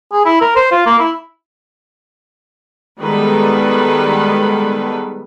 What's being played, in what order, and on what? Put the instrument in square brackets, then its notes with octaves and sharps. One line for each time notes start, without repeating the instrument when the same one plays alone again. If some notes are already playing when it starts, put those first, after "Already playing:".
[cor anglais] G#4
E4
A#4
C5
F4
A#3
E4
[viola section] D#3 G3 G#3 B3 A4 B4